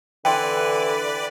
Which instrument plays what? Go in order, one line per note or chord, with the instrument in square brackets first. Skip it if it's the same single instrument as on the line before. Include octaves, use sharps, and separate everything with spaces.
[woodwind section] D3 [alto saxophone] E3 [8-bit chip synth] B4 D5 [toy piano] G5 C6